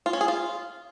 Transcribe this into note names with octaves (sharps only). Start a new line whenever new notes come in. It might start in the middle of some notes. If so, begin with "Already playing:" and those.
F4
C#4
G#4
F4